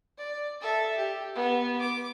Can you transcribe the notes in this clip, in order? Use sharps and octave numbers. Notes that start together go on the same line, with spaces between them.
D5
A4 E5
G4
B3
D6